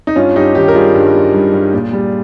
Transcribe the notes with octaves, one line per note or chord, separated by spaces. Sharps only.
D#4
G2 C#4 F4
G2 D#4 G4
D#3 D#4 G4
A#4
G3 F4 G#4
G2
G3
G2
G2
A#2
G3